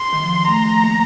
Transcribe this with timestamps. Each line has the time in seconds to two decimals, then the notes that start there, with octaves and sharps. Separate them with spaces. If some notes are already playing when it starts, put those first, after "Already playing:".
Already playing: C6
0.13 D#3
0.24 F3
0.48 A3 A#5
0.66 A3
0.84 A#3